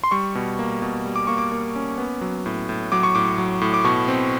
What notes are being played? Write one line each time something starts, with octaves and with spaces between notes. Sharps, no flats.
C6
G3 C#6
B2
A#3
B2
G3
D6
A#3 C#6
D6
A#3
C#4
B3
F#3
A2
A2
F#3 D6
C#6
A2 D6
F#3
A2
D6
B2 C#6
C4